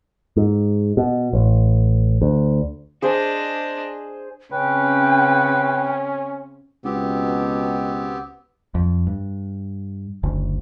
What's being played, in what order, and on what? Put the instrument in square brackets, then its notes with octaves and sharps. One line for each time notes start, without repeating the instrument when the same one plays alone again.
[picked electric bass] G#2
B2
A1
D2
[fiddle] D4 D#5 [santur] G#4 C5 G#5
[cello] C#3 C4 [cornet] C#4 [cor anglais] B4 [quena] G5
[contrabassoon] C#2 [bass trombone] B2 [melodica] B3 C4 G4
[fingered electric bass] F2
G2
F#1 D2